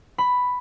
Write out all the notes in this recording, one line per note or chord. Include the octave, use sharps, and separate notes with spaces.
B5